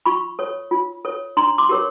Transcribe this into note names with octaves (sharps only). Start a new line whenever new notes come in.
F4 B5 C#6
A4 C#5
F4
A4 C#5
D4 A#5 C6
C6 D6
G4 A#4 C#5